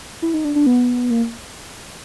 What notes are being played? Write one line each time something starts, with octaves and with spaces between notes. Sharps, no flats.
E4
D#4
D4
D4
B3
A#3